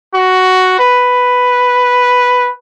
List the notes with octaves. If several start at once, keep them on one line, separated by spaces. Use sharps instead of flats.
F#4
B4